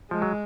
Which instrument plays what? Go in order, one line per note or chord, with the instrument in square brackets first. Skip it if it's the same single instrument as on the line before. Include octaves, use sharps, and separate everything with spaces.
[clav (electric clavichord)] F3 [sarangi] G#3
[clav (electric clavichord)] F#3